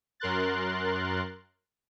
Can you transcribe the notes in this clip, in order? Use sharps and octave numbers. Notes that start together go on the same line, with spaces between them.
F#2 A#4 C6 F#6 A6